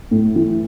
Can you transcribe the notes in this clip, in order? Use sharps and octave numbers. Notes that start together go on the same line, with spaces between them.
A2
E3